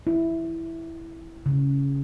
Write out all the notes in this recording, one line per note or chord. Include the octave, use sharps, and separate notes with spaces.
E4
C#3